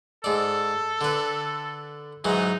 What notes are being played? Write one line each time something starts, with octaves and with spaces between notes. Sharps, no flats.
G#2 A4 D5
D3 B4
G#2 E3 F#3 D#4